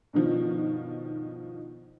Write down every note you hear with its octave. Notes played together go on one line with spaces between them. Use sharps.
G2 B2 D#3 F3